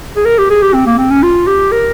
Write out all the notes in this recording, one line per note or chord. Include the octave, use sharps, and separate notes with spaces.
G#4
A#4
G4
G#4
G4
C4
A#3
C4
C#4
F4
G4
A#4